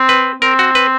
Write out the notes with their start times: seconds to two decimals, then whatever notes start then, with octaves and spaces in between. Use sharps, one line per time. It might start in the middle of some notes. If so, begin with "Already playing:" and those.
Already playing: C4
0.09 B4
0.42 C4 A#4
0.59 F#4
0.75 B4